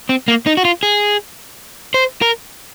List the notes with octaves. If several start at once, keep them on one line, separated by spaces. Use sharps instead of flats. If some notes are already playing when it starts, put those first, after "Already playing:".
C4
A#3
D#4
F#4
F4
G#4
C5
A#4